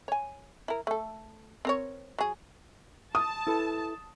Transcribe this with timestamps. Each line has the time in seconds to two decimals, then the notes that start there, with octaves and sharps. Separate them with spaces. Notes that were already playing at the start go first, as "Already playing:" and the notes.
0.08 C#5 G#5
0.68 E4 A#4
0.87 A3 A4
1.65 C4 A#4 C#5
2.18 F#3 G#4
3.15 A5 D#6
3.47 E4 A4 B4